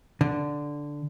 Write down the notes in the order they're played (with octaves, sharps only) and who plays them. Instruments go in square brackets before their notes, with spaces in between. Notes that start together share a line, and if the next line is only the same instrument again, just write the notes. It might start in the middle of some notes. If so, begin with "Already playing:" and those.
[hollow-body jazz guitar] D3